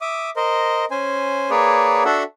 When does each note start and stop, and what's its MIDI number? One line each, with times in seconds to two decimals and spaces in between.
0.01 0.30 76
0.01 0.30 86
0.01 0.30 87
0.36 0.85 70
0.36 0.85 72
0.36 0.85 75
0.91 1.50 61
0.91 1.50 72
0.91 1.50 80
1.50 2.03 58
1.50 2.03 68
1.50 2.03 71
1.50 2.03 73
1.50 2.03 74
2.05 2.23 62
2.05 2.23 66
2.05 2.23 69
2.05 2.23 76
2.05 2.23 78